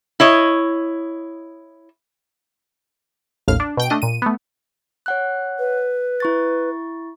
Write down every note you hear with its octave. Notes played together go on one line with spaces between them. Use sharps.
E4 C#5 D#5
A1 D#2 A2 F5 F6
D4
B2 G5 D7
A3 D4 D#5
A#2 D#7
A3 B3
C#5 F#5 F#6
B4
E4 C#6 A6